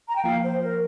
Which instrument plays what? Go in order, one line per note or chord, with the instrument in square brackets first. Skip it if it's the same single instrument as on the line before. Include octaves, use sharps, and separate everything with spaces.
[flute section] A#5
G5
[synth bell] F3 A#3 F4 [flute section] F5
[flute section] C5
A#4